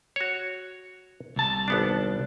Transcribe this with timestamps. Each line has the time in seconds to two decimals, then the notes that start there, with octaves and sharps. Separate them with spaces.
0.16 F#4 C#5
1.36 C2 A5
1.68 G#1 B3 D4